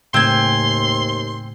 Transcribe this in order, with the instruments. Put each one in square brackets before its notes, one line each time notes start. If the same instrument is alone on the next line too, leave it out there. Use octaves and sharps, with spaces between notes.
[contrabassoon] D#2 [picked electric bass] A2 C#3 A3 [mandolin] C4 G#5 [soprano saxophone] C6